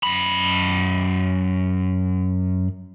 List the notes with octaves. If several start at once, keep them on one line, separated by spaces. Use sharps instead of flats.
F#2 B5